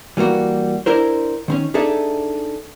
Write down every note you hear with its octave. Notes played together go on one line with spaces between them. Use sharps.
E3 G3 A#3 F#4
D4 E4 A#4 C5
D#3 C4 C#4
D4 D#4 G#4 A4 E5